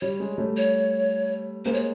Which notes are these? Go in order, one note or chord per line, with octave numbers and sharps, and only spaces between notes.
G3 C#5
G#3
G3 A3
C#5
G#3 A#3 C5
C#5